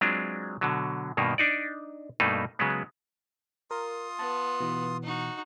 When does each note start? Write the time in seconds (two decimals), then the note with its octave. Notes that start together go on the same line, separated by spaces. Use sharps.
0.01 F#3 G#3 C4 D4 F4
0.61 B2 D3 F#3
1.17 G2 B2 D#3 A#3
1.38 D4 D#4 D5
2.20 G2 B2 A3 A#3 D#4
2.59 C#3 F#3 G#3 B3
3.71 F4 A#4 C6 D#6
4.19 B3 A5
4.60 B2 E3
5.03 D#4 F#4